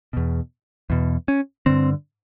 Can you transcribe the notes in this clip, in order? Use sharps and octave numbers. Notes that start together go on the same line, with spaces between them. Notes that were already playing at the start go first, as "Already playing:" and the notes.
E2 B2
E2 B2
C#4
G2 D3 C4